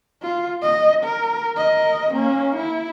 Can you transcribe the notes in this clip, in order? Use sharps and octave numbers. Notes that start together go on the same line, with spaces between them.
F4
D#5
A#4
A#4 D#5
A#3 C#4
E4